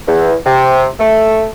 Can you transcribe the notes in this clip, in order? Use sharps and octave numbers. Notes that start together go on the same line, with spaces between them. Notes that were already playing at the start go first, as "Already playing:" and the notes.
E2
C3
A3